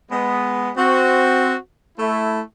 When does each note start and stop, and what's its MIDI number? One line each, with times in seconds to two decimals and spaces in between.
0.11 0.69 56
0.11 0.69 59
0.76 1.55 60
0.76 1.55 66
1.97 2.40 57
1.97 2.40 64